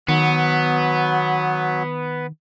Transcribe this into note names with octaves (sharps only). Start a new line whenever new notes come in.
D#3 F#3 B3